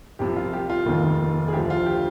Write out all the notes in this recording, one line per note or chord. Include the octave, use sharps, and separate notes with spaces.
C2 C3 F3 G4
F4
G4
F4
F1 D#2 D#3
G#4
D2 D3 F3 G4
F4
G4